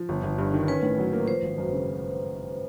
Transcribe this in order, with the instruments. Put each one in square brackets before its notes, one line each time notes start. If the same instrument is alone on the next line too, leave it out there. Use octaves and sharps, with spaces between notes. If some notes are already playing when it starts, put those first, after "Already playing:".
Already playing: [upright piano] F3
G1
G1
G2
D#3
[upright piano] C#4 [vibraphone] B4
[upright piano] A2
F#3
A#3
[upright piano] F3 [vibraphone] C5
[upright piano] G#1
F#2
C#3